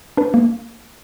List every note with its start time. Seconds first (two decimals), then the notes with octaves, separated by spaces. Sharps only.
0.17 D4 B4
0.34 A#3